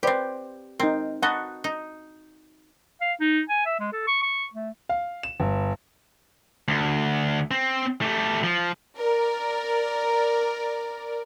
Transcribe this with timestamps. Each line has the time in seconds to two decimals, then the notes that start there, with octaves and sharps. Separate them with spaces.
0.03 C4 G4 B4 C5 D5
0.80 C4 D#4 A#4
1.23 D#4 F#4 D#5 F#5 A5 B5
1.64 D#4
3.01 F5
3.20 D#4
3.49 G#5
3.66 E5
3.79 G#3
3.92 A4
4.08 C#6
4.23 C#6
4.53 A3
4.89 F5
5.23 E7
5.40 G1
6.68 D2
7.51 C4
8.02 A3 G4
8.43 F3
8.96 A#4 D5